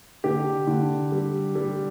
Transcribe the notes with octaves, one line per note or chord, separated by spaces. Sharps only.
D3 G4
D3
G3
G3